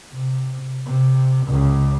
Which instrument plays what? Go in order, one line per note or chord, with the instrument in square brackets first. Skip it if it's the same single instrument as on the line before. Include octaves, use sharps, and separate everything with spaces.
[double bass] C3
C3
C#2 C#3